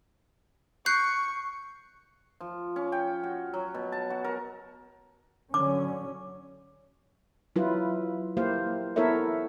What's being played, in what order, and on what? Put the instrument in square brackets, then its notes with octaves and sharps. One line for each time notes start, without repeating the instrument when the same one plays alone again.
[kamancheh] C#6 [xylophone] F#6 G6 C7
[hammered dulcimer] F3
C#4
G5
F#4
F#3
B2
A5
F#4
A#4
[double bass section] D3 F#3 C#4 [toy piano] D6
[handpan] F#3 E4 F4 B4
A#3 E4 G4 C5 F5
B3 E4 A4 A#4 C#5 E5